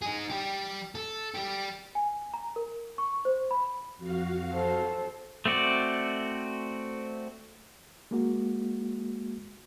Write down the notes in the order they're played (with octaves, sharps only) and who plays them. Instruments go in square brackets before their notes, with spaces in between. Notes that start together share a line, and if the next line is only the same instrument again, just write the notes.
[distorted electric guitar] D#4 G#4
G3 G4
A4
G3 G4
[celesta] G#5
A#5
A#4
C#6
C5
B5
[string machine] F2 F#4 F5
[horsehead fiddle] A4 C5
[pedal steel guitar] A3 C4 F#4 D5
[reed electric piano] G#3 A#3 F#4